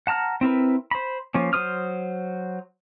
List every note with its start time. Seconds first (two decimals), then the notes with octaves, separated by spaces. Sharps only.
0.07 F#5 A5 A#5 F6
0.41 C4 E4 A#4 B4
0.91 C5 B5
1.35 F3 A#3 C#4
1.53 F#3 A#4 C5 D#6 F6